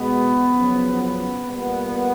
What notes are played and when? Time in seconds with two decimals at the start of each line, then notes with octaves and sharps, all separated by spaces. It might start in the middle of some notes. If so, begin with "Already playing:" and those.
Already playing: B2 G#3 B3
0.51 F#2 C#3 F3
0.99 B3
1.47 A#2 G3 A#3 B3